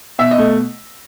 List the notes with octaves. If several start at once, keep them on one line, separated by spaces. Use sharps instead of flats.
B2 E5
D#5
A3